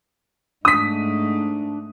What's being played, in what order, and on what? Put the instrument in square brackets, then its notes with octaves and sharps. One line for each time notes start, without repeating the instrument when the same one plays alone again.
[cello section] G#2 A3 [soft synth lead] D4 [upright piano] D#6 B6